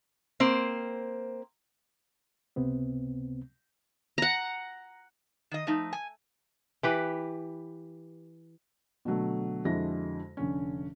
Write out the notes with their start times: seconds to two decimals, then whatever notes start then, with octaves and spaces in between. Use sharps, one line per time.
0.40 A#3 C4 C5
2.56 C#2 C3 B3 C4
4.18 F#5 A#5
5.51 D#3 D#5
5.67 F3 A3 D#4
5.93 G#5
6.83 E3 G4 B4
9.05 B2 D3 F#3 A3
9.65 F2 D3 G#3 E4 F#4 A#6
10.37 F1 D3 C#4